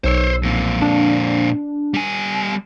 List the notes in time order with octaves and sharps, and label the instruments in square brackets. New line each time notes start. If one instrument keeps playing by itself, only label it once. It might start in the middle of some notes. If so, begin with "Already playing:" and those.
[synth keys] B1 E6 [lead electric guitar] C5 C#5
[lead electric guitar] F2 A#2
[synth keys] D4
[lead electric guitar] G3 G#5